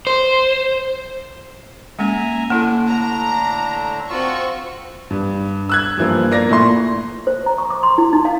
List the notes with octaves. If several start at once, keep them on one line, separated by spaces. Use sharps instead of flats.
C5
G#3 A#3 C#4 E5 G#5 A#5
A2 D3 A#3 D4 E4 A4
A#5
C4 F4 F#4 C#6 E6
G2
E6 F#6 G#6
G2 E3 F3 A#3
A#3 D5 A#6
A#2 A3 E4 C6
C5
A#5
C#6
D6
C6
E4
D#4
F5